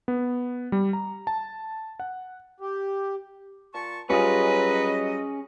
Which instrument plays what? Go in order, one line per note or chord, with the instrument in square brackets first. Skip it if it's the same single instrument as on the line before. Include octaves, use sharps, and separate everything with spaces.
[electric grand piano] B3
G3
A#5
A5
F#5
[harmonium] G4
[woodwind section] A#2 A5 C#6
[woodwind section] F#3 D#5 [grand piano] G3 F4 [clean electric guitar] C#4 G#4 [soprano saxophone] B4